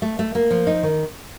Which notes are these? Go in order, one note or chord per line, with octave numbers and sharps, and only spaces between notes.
A3
A3
A#3
F3
D#4
D#3